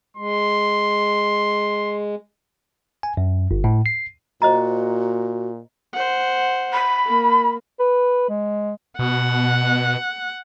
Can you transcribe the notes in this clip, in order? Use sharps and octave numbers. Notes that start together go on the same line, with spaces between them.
G#3 C6
G#5
F#2
G1
A2
C7
A#2 F#4 C5 D#5 A#5
C5 F#5
B5
A#3
B4
G#3
B2 F#5